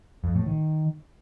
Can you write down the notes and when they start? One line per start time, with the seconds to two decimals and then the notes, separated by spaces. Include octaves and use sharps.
0.24 F2
0.35 A2
0.46 D#3